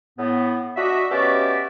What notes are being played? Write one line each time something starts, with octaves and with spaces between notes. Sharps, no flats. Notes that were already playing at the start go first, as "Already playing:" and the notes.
A2 B3
D4 F#4 D#5 E5
B2 C#4 F#4 G4 D5 E5